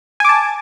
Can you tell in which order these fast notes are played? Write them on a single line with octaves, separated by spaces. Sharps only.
G#5 D6 A5